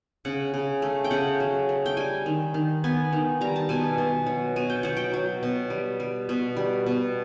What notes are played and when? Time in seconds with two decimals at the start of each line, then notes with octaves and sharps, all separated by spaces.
0.25 C#3 F#5
0.54 C#3
0.82 A3
1.04 G5
1.11 C#3 F#5
1.40 F#3
1.69 A3
1.86 G5
1.97 G3 G#5
2.26 D#3
2.54 D#3
2.84 B3 G#5
3.13 D#3
3.41 G3 A#5
3.56 A5
3.69 B2 G#5
3.98 B2
4.27 F#3
4.56 B2 G#5
4.70 G5
4.83 F#3 F#5
4.97 G5
5.14 F#3
5.43 B2
5.70 G3
6.00 G3
6.29 B2
6.57 G3
6.86 B2